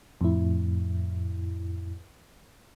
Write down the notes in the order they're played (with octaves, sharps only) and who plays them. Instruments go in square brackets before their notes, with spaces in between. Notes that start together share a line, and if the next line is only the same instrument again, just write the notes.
[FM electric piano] F2 A2 E4